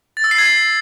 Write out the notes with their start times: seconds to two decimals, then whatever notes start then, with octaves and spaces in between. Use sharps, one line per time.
0.17 A6
0.24 E6
0.31 C7
0.38 G#6